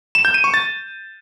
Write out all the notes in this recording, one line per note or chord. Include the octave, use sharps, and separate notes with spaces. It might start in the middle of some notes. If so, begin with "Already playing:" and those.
E7
G6
D#7
C#6
A6